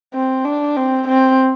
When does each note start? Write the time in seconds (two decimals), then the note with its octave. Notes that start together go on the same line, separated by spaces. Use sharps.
0.14 C4
0.45 D4
0.77 C4
1.08 C4